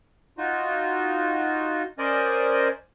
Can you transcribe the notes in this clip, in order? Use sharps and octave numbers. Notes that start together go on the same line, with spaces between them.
D#4 F4 F#4
C#4 A#4 C5 D5 D#5 G#5